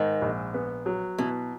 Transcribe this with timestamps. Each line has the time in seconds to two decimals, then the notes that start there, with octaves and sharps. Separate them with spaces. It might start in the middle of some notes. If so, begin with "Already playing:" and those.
Already playing: G#2 D#3
0.22 A#1
0.54 B3
0.86 F#3
1.18 B2 E3